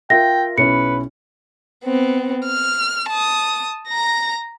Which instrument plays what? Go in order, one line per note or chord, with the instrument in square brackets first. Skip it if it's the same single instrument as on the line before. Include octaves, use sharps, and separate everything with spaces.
[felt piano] F4 A#4 E5 [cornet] G5 [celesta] A#6
[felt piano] B1 C#4 E4 [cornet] B4 [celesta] C#7
[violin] B3 C4
F6
A5 D#6
A#5 A#6